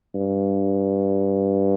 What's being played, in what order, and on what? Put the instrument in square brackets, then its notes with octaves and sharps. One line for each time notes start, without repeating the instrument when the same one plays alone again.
[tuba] G2